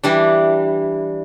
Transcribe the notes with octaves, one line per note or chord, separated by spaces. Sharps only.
E3 G3 D4